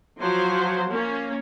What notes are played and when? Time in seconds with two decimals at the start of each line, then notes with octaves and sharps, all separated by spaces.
0.21 F3 F#3 C5
0.90 A#3 C#4